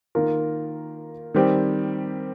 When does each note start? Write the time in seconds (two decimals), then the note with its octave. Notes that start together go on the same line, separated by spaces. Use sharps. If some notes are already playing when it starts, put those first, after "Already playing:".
0.15 D#3 A#3 F4 A#4
1.34 D#3 G3 C4 G4